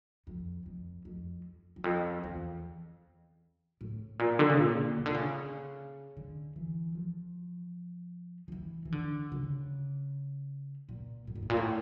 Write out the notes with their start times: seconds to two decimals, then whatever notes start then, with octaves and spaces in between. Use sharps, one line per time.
0.27 F2
0.66 F2
1.05 F2
1.76 E2
1.84 F2
2.24 E2
3.81 A2
4.19 A#2
4.39 D3
4.49 C#3
4.59 A#2
4.98 C#3
5.06 D3
5.14 C#3
6.17 D3
6.56 E3
6.95 F3
8.48 F3
8.52 E3
8.85 E3
8.92 D3
9.32 C#3
10.89 A#2
11.27 A2
11.36 A#2
11.42 A2
11.50 A#2
11.57 A2